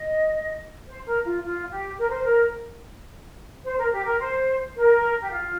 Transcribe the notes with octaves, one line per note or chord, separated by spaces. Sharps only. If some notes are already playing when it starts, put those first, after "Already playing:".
Already playing: D#5
C5
A#4
F4
F4
G4
A#4
C5
A#4
C5
A#4
G4
A#4
C5
A#4
G4
F4